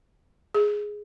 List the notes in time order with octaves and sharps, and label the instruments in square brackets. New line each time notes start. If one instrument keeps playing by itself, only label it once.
[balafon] G#4